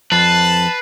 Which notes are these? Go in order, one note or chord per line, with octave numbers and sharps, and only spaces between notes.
F2 B4 A5 F#6 C7